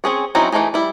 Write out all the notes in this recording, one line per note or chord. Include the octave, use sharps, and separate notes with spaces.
C4 C#4 G#4 C#5
F#3 C4 C#4 D#4 E4
E3 F3 A3 D#4 G#4
G3 E4